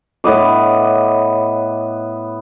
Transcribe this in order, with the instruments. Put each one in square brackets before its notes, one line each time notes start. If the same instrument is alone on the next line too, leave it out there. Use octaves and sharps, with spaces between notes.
[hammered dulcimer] A2 B3 D#5 D6